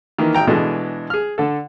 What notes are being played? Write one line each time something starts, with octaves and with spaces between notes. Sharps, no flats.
D#3 E3 A#3
G#1 G5 A#5
B2 E3 G#3 D4 A4 D#5
G#4 F6
D3 A4